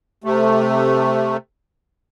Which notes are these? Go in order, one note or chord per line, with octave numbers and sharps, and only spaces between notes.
C3 A3